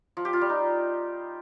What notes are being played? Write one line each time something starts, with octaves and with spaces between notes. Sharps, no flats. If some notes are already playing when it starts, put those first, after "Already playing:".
F3
G4
F4
G3
D#4